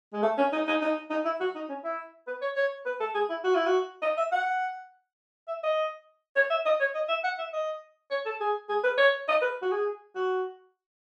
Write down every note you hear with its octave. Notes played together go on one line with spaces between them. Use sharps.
G#3
A3
C#4
D#4
D#4
D#4
D#4
E4
F#4
D#4
C#4
E4
B4
C#5
C#5
B4
A4
G#4
E4
F#4
E4
F#4
D#5
E5
F#5
E5
D#5
C#5
E5
D#5
C#5
D#5
E5
F#5
E5
D#5
C#5
A4
G#4
G#4
B4
C#5
D#5
B4
F#4
G#4
F#4